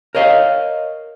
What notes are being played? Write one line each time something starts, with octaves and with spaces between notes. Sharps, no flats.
A#4 C#5 D#5 F5